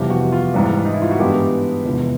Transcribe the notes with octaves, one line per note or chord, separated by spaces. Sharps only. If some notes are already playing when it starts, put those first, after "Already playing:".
Already playing: F2 C3 E3 G3 B3 G4
F#4
F4
G#2 E3 G3
D#4
E4
F4
F#4
G2 E3 G#3 B3 G4
E2 C3 F3 G#3 B3